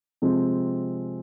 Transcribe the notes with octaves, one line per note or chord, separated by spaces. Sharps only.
C3 F3 G#3 C4